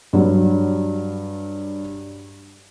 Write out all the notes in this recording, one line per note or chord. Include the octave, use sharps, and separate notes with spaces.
G2 F#3